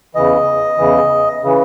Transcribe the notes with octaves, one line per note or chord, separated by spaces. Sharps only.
E2 C#3 E3 D#5
E2 C#3 E3
C#3 E3